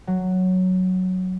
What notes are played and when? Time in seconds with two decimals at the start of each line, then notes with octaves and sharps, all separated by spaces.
0.07 F#3